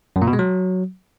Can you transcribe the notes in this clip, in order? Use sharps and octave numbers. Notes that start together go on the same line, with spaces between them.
F#2
A#2
B2
G#3
F#3